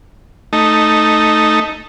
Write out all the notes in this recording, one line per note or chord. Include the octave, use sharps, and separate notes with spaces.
A3 D#4